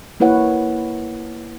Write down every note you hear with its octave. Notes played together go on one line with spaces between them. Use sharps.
A#3 E4 B4 C#5 F#5